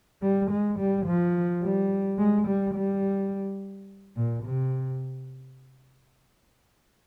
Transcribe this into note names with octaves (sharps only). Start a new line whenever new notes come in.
G3
G#3
G3
F3
G3
G#3
G3
G3
A#2
C3